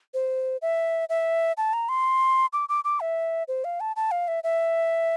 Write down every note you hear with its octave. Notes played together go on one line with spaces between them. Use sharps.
C5
E5
E5
A5
A#5
C6
D6
D6
D6
E5
C5
F5
A5
A5
F5
E5
E5